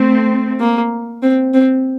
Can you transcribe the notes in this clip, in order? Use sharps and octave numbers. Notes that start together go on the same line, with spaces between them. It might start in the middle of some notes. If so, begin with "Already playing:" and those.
Already playing: A3 C4
A#3
C4
C4